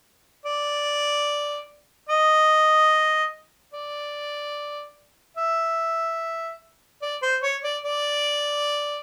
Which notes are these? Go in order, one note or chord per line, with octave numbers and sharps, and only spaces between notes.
D5
D#5
D5
E5
D5
C5
C#5
D5
D5